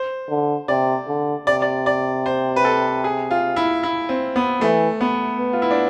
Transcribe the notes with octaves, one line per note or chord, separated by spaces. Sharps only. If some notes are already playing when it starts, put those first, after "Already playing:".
Already playing: C5
D3
C3 D5
D3
C3 D5
D5
D5
C5
B4
A4
G#4
F4
E4
E4
C4
B3
E3 A3
B3
B3
F4
E4
D4